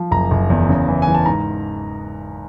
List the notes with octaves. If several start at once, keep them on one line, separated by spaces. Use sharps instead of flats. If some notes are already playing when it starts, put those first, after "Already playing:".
Already playing: F3
F#1 A#5
F#1
E2
C#3
E3
E3 G#5
A5
G#2 A#5